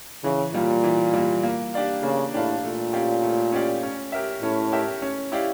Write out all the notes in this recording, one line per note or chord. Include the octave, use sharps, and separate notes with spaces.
C#3 E3
A#2 G3 A#3
E3
G3 A#3
A#3
D4 G4 D5 F5
C#3 A#3
A2 D4 G4 D5 F5
A#2 A3
C#4 G4 D5 F5
A3
C#4 G4 D5 F5
C#4
G4 A#4 E5
A2 C#4
G4 A#4 E5
C#4
E4 G4 D5 F5